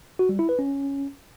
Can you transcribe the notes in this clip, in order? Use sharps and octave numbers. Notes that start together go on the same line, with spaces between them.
F#4
G3
E4
B4
C#4